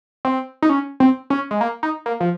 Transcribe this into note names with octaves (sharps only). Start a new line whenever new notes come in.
C4
D#4
C#4
C4
C#4
G#3
A#3
D#4
A#3
F3